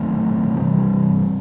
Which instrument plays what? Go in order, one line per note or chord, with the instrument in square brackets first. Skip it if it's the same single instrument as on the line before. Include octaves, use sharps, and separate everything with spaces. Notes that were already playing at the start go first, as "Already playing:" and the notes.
Already playing: [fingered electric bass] D#3 F#3 A3 C4
C3 E3 G3 C4